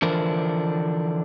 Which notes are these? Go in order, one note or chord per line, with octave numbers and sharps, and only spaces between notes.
D3 E3 F3 D4 A#4 C5